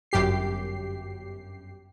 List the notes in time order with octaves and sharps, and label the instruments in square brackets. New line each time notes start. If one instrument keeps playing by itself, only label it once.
[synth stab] G1 F#2 G4 C7